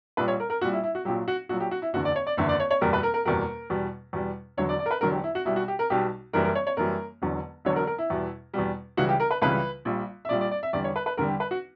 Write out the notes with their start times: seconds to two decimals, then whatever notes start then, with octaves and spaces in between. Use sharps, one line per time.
0.17 A#1 A#2 G3 B4
0.28 C#5
0.40 A#4
0.50 A#4
0.61 A#1 A#2 G3 F#4
0.73 E4
0.84 E4
0.95 F#4
1.05 A#1 A#2 F#3 G4
1.28 F#4
1.49 A#1 A#2 F#3 F#4
1.60 G4
1.71 F#4
1.82 E4
1.93 F#1 E2 D3 F#4
2.05 D5
2.16 C#5
2.27 D5
2.37 F#1 E2 D3 E5
2.49 D5
2.60 C#5
2.71 C#5
2.81 F#1 E2 B2 G3 A#4
2.93 B4
3.03 A#4
3.14 A#4
3.25 F#1 E2 B2 G3 A#4
3.70 E2 B2 G3
4.13 E2 B2 G3
4.57 E1 E2 D3 F#3 C#5
4.69 D5
4.79 D5
4.86 A#4
4.91 B4
5.01 E1 E2 D3 F#3 A#4
5.13 G4
5.24 E4
5.35 F#4
5.45 B1 B2 G3 E4
5.56 F#4
5.68 G4
5.79 A#4
5.90 B1 B2 G3 G4
6.33 F#1 F#2 E3 G3 A#4
6.44 A#4
6.55 C#5
6.67 C#5
6.77 F#1 F#2 E3 G3 A#4
7.22 E1 E2 D3 F#3
7.65 E1 E2 D3 F#3 C#5
7.76 A#4
7.87 A#4
7.98 E4
8.10 E2 B2 G3
8.54 E2 B2 G3
8.97 C#2 C#3 E3 G3 F#4
9.09 G4
9.20 A#4
9.31 B4
9.42 C#2 C#3 E3 G3 B4
9.85 A#1 A#2 G3
10.25 E5
10.29 A#1 A#2 G3 D5
10.41 D5
10.51 D5
10.63 E5
10.73 E2 D3 G3 D5
10.84 C#5
10.96 B4
11.06 B4
11.17 E2 D3 G3 A#4
11.28 G4
11.40 B4
11.51 F#4